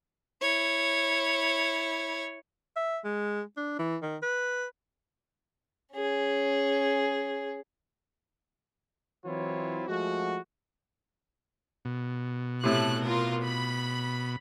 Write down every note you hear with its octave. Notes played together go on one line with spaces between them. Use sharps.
E4 C#5
E5
G#3
D4
E3
D#3
B4
C#4 G#4
E3 F#3 C4 E4 F4 C#5
F3 G#3 A3 F#4
B2
A2 C3 A3 F#6
F4 A#4
B5